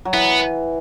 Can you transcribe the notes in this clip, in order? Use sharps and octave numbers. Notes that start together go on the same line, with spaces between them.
F#3
E3 B3